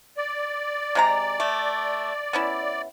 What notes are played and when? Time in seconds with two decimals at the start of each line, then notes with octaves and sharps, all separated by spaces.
0.17 D5
0.95 C3 G#3 A#5
1.40 A3
2.33 B3 C#4 E4